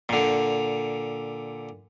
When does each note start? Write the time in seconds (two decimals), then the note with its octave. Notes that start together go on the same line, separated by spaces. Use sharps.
0.09 A#2 D3